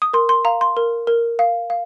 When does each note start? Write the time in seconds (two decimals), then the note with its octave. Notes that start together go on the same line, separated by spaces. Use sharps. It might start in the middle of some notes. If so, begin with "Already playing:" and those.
0.02 D#6
0.13 A#4 C6
0.29 C6
0.45 F5 A#5
0.61 C6
0.77 A#4
1.07 A#4
1.39 F5
1.70 F5